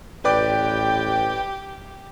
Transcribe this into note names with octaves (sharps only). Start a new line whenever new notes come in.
A1 G4 B4 D5 G5 D6